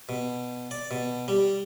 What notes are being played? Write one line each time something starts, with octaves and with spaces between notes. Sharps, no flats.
B2
D5
B2
G3